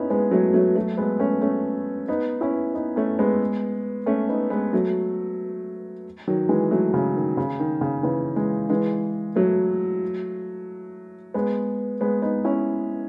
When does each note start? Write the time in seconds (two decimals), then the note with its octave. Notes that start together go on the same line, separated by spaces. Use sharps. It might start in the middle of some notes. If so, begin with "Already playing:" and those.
Already playing: B3 C#4 D#4 E4
0.10 G#3 B3
0.31 F#3 A3
0.54 F#3 A3
0.75 F#3 A3
0.97 G#3 B3
1.20 A3 C#4
1.42 A3 C#4
2.08 B3 D#4
2.41 C#4 E4
2.74 B3 D#4
2.96 A3 C#4
3.19 G#3 B3
4.06 A3 C#4
4.29 B3 D#4
4.50 G#3 B3
4.73 F#3 A3
6.27 D#3 F#3
6.49 E3 G#3
6.71 F#3 A3
6.94 C#3
7.16 D#3
7.37 C#3
7.60 D#3
7.81 C#3
8.03 C#3 E3
8.36 E3 G#3
8.69 E3 G#3
9.36 F#3 A3
11.34 G#3 B3
12.01 G#3 B3
12.22 B3 D#4
12.44 C#4 E4